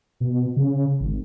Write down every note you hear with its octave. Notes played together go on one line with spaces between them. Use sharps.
B2
C#3
G#1